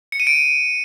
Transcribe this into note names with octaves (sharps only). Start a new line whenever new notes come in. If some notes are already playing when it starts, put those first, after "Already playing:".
C#7
D#7
D7